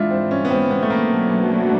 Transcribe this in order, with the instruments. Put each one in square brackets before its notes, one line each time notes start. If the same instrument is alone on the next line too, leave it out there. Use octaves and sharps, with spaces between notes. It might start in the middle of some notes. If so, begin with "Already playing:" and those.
Already playing: [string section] G#2 E3 G#3 [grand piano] D4 E4 F4
[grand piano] C4
C#4
B3
C4
B3
A3
A#3
[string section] B2 F#3 A3 D4 F#4